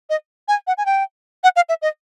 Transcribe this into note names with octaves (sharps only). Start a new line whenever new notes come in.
D#5
G#5
F#5
G#5
G5
F#5
F5
E5
D#5